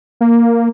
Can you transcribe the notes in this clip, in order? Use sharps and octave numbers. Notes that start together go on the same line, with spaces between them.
A#3